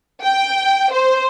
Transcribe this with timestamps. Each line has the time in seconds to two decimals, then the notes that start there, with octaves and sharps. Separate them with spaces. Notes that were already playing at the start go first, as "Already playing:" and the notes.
0.23 G5
0.92 C5